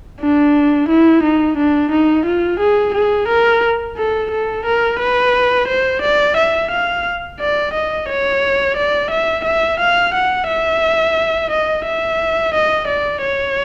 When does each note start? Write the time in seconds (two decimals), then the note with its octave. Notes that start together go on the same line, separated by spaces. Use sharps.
0.20 D4
0.89 E4
1.23 D#4
1.57 D4
1.91 D#4
2.26 F4
2.60 G#4
2.94 G#4
3.28 A#4
3.97 A4
4.31 A4
4.65 A#4
4.99 B4
5.68 C5
6.02 D5
6.37 E5
6.71 F5
7.40 D5
7.74 D#5
8.08 C#5
8.77 D5
9.11 E5
9.44 E5
9.80 F5
10.14 F#5
10.47 E5
11.51 D#5
11.85 E5
12.54 D#5
12.88 D5
13.22 C#5